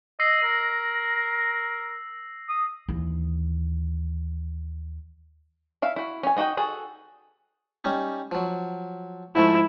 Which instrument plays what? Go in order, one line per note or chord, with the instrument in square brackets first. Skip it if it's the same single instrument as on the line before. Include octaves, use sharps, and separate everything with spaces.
[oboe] D#5 [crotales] E6 A#6 C7
[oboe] A#4
D#6
[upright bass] D#2 E3
[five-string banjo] E4 E5 F5
E4 F#4
C#4 G#5
D4 D#4 F#4 D#5 G5
F#4 G#4 A4
[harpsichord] G3 C#4 D#4
F3 F#3
[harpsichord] G#2 F3 A3 [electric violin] E4